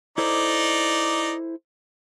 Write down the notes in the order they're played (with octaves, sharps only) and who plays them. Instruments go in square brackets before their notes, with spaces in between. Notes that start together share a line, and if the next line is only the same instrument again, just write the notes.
[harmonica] D#4 D5 [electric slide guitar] E4 A4 C5